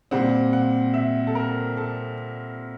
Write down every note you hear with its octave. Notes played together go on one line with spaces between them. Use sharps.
A#2 G3 C4 F#5
F#5
E5
A4
A#4
A4